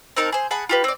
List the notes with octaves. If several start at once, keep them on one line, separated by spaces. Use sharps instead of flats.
C4 D#4 A#4 A5
G#4 C5
G#4 F#5 A5 B5
F4 G4 B4
C4 D5